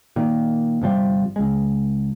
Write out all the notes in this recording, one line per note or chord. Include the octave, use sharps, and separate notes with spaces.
A#2 D#3
G1 C3 F3 G3
C#2 G#3